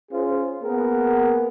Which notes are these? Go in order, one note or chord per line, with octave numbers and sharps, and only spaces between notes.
C#4 F4 G#4 C5
A#3 B3 G#4 A#4